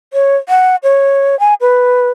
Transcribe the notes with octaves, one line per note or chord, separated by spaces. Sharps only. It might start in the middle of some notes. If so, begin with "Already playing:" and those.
C#5
F#5
C#5
G#5
B4